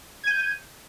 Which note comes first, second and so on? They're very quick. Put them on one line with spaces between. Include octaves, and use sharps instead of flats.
G#6 D#7 G6